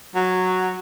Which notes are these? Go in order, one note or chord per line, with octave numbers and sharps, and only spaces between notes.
F#3